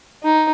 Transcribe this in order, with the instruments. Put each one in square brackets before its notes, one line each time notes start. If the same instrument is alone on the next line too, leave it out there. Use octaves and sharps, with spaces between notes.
[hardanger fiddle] D#4